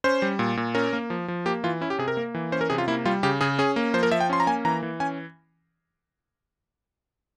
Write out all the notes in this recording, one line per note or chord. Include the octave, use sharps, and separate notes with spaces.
C#4 C5
G3
A#2
A#2
C#4 A#4
A#3
F3
F3
A#3 G4
E3 F4
C#4 E4
G4
C3 G#4
A#4
A#3
E3
C#4 C5
A#4
C3 G#4
F4
A#3 E4
G3 F4
C#3 G4
C#3 G#4
C#4 G#4
A#3
F3 C5
A#4
F3 E5
G5
C#4 C6
A#5
A#3 G#5
E3 A#5
E3
C#4 G#5